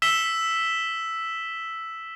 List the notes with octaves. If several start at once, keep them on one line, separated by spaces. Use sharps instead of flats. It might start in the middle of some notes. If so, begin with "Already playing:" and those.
E6 B6 E7 G7